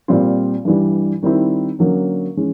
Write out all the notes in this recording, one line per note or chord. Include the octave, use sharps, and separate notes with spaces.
A#2 G3 C4 F4
G2 E3 G3
D#3 G3 C4 E4
D3 F#3 A#3 C#4
E3 G#3 C#4